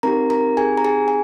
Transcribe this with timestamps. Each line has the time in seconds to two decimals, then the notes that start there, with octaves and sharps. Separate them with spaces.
0.03 C4 D#4 G4 A#4 A#5
0.30 A#4 A#5
0.57 G#4 G#5
0.78 A#5
0.84 G#4 G#5
1.08 G#5